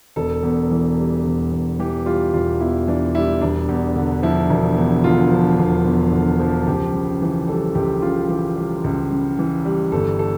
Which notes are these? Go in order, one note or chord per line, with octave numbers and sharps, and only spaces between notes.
E1 A4
E2
E3
G3
E1
E2
E3 G4
G3 F4
E1 F4
E2 E4
E3 D4
G3 E4
E1 D4
E2
D3
F3 E4
E1
E2
D3 F4
F3
E1
E2
D3
F3
C#2 G4
C#3
E3
G3 A4
C#2 G4
C#3 F4
E3 G4
G3
C#2
C#3
E3
G3
G1 A4
A4